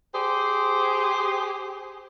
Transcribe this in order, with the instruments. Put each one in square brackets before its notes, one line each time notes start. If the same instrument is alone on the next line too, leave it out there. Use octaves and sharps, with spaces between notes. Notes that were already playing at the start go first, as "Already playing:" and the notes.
[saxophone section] G4 G#4 C5